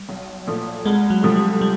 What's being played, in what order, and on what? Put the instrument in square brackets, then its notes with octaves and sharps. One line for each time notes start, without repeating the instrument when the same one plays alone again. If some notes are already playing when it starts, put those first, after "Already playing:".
Already playing: [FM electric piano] G3
[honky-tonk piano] B1
A#2 F3 A3
[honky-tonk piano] C2 [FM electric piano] G#3
[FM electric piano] F#3
[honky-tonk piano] C3 F3 A3
[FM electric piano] G3
G3